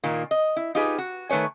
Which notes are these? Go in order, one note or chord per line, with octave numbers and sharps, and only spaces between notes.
A#2 D#3 A#3
D#5
E4
D#4 F4 G4 G#4 B4
F#4
D#3 A3 B4 C#5 G#5